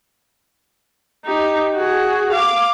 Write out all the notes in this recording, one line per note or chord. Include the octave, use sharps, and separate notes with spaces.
D#4 G4
F#4 G#4
F5 D6